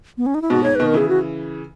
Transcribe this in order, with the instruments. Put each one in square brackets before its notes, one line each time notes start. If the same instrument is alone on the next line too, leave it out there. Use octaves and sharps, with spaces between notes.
[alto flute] B3
C#4
D#4
E4
[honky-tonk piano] G#2 B2 [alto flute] F#4
[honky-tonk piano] G#2 [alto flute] C#5
[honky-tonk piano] B2 D#3 [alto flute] B4
[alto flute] A#4
[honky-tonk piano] C#3 E3 [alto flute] G#4
[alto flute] F#4